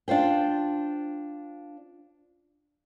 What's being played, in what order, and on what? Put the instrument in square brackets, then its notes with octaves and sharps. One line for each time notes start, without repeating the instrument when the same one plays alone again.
[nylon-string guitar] D4 F4 C5 G5